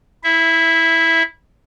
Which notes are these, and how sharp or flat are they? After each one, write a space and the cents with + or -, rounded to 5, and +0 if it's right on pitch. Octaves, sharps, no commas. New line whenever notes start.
E4 -10 E5 +0